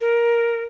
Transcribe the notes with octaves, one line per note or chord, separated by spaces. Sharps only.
A#4